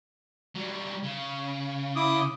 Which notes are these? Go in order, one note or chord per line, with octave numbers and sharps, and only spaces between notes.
F#3 G3
C#3
E4 D6 D#6